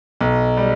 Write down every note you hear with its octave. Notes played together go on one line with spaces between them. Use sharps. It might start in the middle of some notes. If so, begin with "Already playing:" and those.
B1
G3